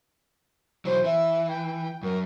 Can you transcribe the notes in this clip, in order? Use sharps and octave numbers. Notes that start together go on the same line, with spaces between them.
B2 E3 F#3 C5
E3 E5
G5
F#2 A#4